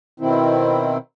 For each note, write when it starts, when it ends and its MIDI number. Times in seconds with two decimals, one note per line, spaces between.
0.20 0.98 47
0.20 0.98 51
0.20 0.98 60
0.20 0.98 64